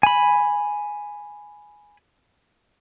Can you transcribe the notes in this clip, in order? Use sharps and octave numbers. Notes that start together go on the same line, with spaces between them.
G#5 B5